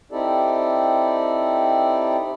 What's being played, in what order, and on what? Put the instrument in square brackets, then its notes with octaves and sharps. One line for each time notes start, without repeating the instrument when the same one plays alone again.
[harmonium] C4 D#4 E4 G4 A4 D5